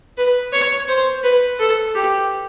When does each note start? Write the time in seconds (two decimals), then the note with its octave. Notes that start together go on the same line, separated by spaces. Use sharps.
0.17 B4
0.53 C#5
0.88 C5
1.23 B4
1.59 A4
1.95 G4